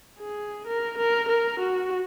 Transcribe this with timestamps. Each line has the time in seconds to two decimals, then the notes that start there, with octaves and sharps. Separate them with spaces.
0.20 G#4
0.67 A#4
0.97 A#4
1.28 A#4
1.60 F#4